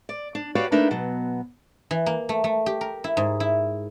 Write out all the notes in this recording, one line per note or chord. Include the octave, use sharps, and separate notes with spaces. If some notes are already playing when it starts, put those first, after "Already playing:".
D5
D4
F#4 G4 B4 C#5 D5 F5
A3 A#3 D4 D#4 B4 E5
B2 F#3 B3
E3
A#3
A3
A3
G4
A#4
E4
G#2
E4